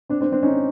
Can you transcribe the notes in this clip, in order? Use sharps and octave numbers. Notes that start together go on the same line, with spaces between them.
C4 D4
C4 D4
C4 D4
C#4 D#4